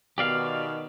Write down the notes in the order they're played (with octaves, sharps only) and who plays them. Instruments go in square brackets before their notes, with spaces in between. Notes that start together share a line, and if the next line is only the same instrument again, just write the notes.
[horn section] B2 D#3 [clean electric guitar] G4 D5 F5